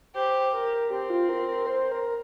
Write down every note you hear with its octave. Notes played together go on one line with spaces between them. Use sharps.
G4 C5
A#4
C4 G4
F4
A#4
A#4
C5
A#4